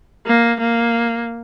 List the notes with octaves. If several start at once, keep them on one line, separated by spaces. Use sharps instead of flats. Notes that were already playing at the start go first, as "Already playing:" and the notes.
A#3
A#3